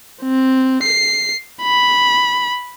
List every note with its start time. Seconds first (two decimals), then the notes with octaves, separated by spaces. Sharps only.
0.23 C4
0.83 C7
1.62 B5